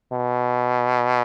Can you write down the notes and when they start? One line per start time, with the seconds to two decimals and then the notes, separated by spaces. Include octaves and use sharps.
0.12 B2